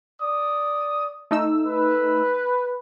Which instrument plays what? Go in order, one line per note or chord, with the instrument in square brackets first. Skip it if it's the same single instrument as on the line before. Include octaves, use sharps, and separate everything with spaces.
[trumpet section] D5 D#6
[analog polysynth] A3 D#4 E6
[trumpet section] B4